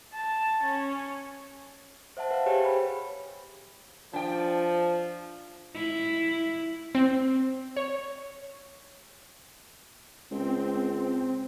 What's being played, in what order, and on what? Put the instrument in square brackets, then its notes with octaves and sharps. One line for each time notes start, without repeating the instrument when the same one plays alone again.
[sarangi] A5
C#4
[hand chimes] C5 E5 F#5 A5
B4 F5
G4 G#4 C5 C#5 G5 G#5
B5
[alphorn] F3 [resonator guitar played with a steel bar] D4 G5
[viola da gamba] E4
[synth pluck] C4
C#5
[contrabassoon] C#2 [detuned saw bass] C4